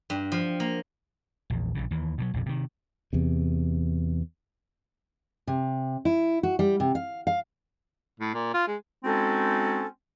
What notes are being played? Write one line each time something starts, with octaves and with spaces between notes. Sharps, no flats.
G2
F3
A#3
A#1 E2
A#1 A#2 C#3
D#2 E3
B2 D3 F#3
A#1 F2 C3
C3 D#3
E2 C3
C3
E4
F#4
G3
C3
F5
F5
A2
A#2
F4
G#3
G#3 C4 C#4 D#4 F#4 A4